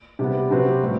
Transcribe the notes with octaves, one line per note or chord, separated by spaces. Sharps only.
C3 G3 B3
C3 F#3 C4 G4 B4
A2 G3